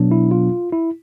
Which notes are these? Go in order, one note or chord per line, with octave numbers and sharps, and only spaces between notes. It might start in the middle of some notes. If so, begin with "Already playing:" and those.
Already playing: B2 F#3 B3 D4
E4
F4
E4